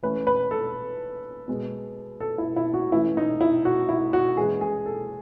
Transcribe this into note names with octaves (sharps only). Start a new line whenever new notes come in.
E3 A3 C#4 B4
B4
A4
B2 G#3 B3
A4
E4
E4
F#4
E3 A3 C#4 E4
D#4
E4
F#4
E4
F#4
E3 G#3 C#4 G#4
G#4
A4